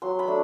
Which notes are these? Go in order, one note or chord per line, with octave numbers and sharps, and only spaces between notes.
F#3 C6
B5
A3 D4